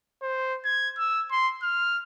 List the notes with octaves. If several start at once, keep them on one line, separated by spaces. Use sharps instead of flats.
C5
G#6
E6
C6
F6